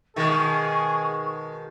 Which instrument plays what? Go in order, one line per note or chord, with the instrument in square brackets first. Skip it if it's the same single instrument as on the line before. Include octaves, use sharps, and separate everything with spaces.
[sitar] B2 D#3 G#3 [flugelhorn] G#4 [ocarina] C#6